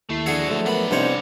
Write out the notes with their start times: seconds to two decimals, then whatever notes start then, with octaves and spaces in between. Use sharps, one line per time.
0.09 D#2 A3 E4 C7
0.26 D3 F#4 G#4 E5 F#5
0.47 F3 F#3 A3
0.66 D3 B3 A#4 B5
0.91 C2 D#3 B3 D4 C5 C#5